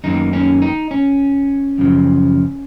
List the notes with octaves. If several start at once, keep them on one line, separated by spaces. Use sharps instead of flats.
F#2 D#3 A#3 D#4
C#4
D#4
C#4
F#2 C#3 F3